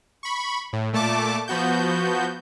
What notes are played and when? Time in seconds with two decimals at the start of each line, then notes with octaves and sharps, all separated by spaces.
0.23 B5 C#6
0.73 A2
0.93 A#2 A3 A5 D6
1.48 F3 B3 F#4 G6